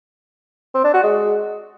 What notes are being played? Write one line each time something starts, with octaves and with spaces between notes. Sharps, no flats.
C4
D4
F#4
G#3